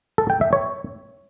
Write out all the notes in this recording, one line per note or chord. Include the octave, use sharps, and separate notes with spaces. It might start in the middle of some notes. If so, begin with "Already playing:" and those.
A4
G5
E5
C#5